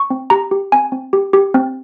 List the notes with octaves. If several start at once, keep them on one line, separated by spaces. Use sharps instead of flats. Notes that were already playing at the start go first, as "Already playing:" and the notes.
Already playing: C#6
C4
G4 A#5
G4
C4 G#5
C4
G4
G4
C4